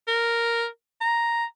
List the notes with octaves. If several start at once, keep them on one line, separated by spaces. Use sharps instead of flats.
A#4
A#5